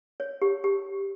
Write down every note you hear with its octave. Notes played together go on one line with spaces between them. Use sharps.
C#5
G4
G4